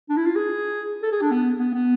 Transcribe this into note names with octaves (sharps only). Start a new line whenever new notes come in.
D4
E4
F4
G#4
A4
G#4
D4
B3
B3
B3